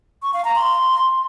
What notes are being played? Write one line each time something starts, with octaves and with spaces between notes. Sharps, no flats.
C#6
F5
A#5
C6